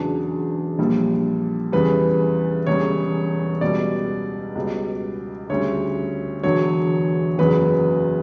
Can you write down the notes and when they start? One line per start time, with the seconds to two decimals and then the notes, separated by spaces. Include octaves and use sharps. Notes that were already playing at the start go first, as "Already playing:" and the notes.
Already playing: E1 E2 C#3 F#3 D4
0.79 A#1 A#2 G3
1.72 E2 C#3 E3 G3 B4
2.67 E1 E2 C#3 G3 C#5
3.61 C#2 B2 G3 D5
4.55 C#2 B2 G3
5.50 D2 C#3 G3 C#5
6.43 E1 E2 D3 F#3 C#5
7.38 F#1 E2 C#3 F#3 B4